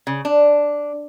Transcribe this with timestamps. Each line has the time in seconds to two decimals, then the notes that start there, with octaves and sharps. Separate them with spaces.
0.07 C#3
0.25 D4